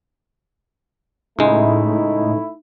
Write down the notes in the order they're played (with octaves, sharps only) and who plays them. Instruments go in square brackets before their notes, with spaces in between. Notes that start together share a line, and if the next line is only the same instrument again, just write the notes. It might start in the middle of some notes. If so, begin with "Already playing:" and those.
[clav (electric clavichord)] C#2 G#3 [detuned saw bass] A2 [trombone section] A3 E4 [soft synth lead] D#4